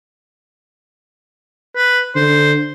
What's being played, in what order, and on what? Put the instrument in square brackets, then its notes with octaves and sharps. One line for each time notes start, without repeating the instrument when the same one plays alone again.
[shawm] B4
[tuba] D3 [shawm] C5